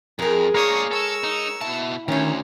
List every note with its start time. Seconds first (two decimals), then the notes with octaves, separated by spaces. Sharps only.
0.19 F2 G#3 G#4 A#4
0.54 A#3 D4 A#4 C#5 C#6 D#6
0.91 A4 C#6 E6
1.24 D#4
1.61 B2 E4 A5
2.08 D2 D#3 C4 C#4 E4